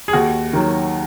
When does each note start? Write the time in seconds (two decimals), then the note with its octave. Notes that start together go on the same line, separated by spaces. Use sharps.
0.08 G#4
0.13 D#2 F#4
0.53 D#3 F#3